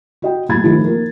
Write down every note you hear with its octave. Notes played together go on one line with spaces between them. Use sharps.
F#4 D#5 G5
B1 A2 A#3 B5 G#6 A6
D#3 F3 A3
A#3 A#4